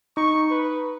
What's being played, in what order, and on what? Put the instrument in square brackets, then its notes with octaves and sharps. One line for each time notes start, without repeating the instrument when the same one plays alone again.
[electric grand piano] D#4 [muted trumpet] C#6
[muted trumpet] B4